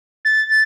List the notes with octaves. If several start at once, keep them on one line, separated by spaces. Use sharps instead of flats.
A6